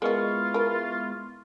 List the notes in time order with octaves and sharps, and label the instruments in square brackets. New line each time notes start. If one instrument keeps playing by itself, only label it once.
[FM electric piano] G#3 B3 C#6 [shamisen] A#3 D#5 [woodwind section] E4 F4
[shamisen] A#4 B4